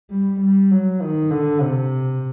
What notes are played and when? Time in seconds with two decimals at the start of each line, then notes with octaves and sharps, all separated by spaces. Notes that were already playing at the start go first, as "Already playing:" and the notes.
0.11 G3
0.41 G3
0.71 F#3
1.02 D#3
1.31 D3
1.61 C3